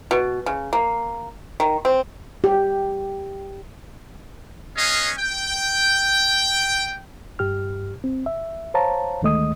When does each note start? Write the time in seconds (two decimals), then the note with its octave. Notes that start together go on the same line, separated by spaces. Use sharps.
0.11 B2
0.46 C#3
0.73 A#3
1.60 D#3
1.85 C4
2.44 G4
4.76 B3 C#4 G#4 C#5 D#5 F5
5.18 G5
7.39 G2 G4 F6
8.04 C4
8.26 E5
8.74 C5 C#5 F5 A5 A#5
9.22 D2 D#3 G#3 A3 D#5 D#6